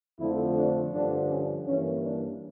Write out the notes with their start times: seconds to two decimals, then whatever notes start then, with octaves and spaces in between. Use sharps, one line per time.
0.19 F2 D3 F3 A3 E4
0.56 D4
0.93 G2 D3 F3 D4
1.30 C#4
1.67 G2 E3 A#3 C#4
2.04 D4